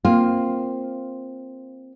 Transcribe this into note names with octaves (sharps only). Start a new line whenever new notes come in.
A#3 C4 F4